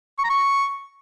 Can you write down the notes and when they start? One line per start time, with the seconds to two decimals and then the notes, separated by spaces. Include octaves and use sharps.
0.19 C#6
0.24 A#5
0.30 C#6